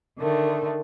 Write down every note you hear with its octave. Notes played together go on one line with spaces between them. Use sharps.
D3 D#3 A3